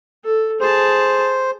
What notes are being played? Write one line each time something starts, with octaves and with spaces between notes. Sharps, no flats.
A4
G#4 C5 A5